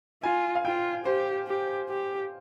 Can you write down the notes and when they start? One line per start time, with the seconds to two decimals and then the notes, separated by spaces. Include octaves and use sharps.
0.23 F4 G#5
0.55 F5
0.65 F4 G5
1.05 G4 C5
1.47 G4
1.89 G4